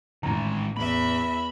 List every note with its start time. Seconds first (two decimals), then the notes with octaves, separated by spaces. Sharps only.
0.23 A1 D#3 G#3 A#5
0.76 E2 B4 E5 B5